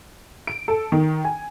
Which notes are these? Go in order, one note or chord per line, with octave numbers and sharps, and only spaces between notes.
D7
A4
D#3
G#5